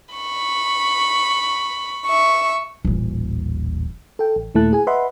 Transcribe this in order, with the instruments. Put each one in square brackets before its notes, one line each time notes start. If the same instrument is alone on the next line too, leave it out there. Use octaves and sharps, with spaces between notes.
[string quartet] B5 C#6
E5 C#6
[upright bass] D#1 A1
[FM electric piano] A4 G5
A1
D#2 A#2 A3 E4 A5 F#6
G#4 G#5
B4 D#5 E5 F#5 B5 C6